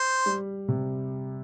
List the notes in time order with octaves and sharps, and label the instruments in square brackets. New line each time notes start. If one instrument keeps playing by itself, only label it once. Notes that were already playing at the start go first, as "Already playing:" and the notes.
Already playing: [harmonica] C5
[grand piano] G3
C3